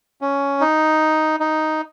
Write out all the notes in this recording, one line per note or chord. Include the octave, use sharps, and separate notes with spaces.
C#4
D#4
D#4